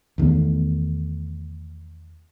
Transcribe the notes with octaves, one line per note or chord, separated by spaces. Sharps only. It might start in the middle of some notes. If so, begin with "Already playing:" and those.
E2 D#3 A3 B3